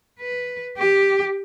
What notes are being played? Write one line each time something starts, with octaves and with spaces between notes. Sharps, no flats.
B4
G4